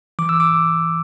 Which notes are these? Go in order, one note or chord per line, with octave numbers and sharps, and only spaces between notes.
E3 D6
E6
D6